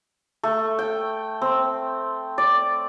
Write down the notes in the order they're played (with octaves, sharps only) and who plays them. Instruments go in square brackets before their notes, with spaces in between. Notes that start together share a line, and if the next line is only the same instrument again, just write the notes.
[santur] A3
G5
C4
D5